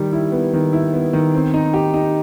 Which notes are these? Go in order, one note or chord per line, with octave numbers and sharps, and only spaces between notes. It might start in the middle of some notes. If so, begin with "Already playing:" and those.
Already playing: D#3 G3
E4
B3
D#3
E4
B3
D#3
C4
D#4
G4
D#4